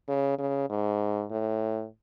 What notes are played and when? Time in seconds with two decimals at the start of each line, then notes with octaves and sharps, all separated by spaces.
0.08 C#3
0.38 C#3
0.70 G#2
1.31 A2